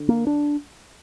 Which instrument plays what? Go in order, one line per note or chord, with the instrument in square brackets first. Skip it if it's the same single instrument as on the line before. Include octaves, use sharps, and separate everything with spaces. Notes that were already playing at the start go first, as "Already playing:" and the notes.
Already playing: [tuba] D3
[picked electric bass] A#3
D4